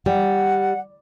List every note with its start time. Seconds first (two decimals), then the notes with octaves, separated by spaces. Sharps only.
0.06 G3 F#5